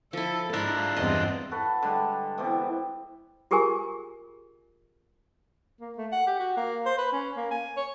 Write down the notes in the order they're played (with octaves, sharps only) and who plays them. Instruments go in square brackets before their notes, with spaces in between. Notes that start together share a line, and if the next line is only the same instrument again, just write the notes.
[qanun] F3 E4 [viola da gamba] A4
[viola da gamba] G#2 [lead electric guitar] D4 F4 [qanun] E4 A#4 C6
[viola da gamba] E2 G2 C4 [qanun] D#5 C6
[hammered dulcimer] F#4 A4 B4
D3 G3 G#3 B4
B2 E3 G3 C4
[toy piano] F4 G4 G#4 A#4 G#5
[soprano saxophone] A#3
A3
F#5
G4
F#4
A#3
C5
B4
C#4
A#3
G#5
C#5